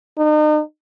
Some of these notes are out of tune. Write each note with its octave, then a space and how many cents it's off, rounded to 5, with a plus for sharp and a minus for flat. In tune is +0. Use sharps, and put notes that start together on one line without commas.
D#4 -40